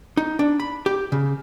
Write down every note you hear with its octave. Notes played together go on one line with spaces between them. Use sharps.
D#4
D4
B5
G4
C#3